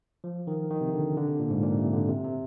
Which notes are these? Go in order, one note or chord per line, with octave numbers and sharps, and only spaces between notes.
F3
D#3
D#3
C3
D3
D3
C3
A#2
G#2
A#2
C3
D3
C3
C3